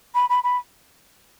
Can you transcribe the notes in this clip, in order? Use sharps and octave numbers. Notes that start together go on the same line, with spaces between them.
B5
B5
B5